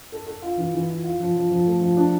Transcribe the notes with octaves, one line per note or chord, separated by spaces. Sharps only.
A4
A4
F4
E3
E3
F4
F4
F3
F3
F3
A3
F3
D4